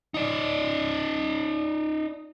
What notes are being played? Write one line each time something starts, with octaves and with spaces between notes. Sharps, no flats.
D#4 D5